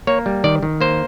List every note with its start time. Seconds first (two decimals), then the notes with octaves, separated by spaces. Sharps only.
0.07 A#3 C#5
0.26 G3
0.44 D#3 D5
0.63 D#3
0.81 A#3 C5